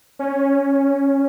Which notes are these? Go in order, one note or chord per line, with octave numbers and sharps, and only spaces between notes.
C#4